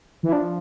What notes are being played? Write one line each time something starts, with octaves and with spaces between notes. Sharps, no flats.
E3
E4
F3 D4